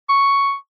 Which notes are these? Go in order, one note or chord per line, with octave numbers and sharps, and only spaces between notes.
C#6